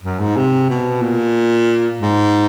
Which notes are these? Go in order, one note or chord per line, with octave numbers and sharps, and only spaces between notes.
F#2
G#2
C3
B2
A#2
G#2